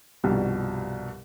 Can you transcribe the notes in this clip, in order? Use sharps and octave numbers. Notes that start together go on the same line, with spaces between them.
C2 G2 B2 F3 G3